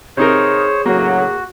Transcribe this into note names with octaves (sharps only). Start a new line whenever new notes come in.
C3 D#4 G#4 A#4 C5 C#5
A2 C#3 F#3 A#3 F#4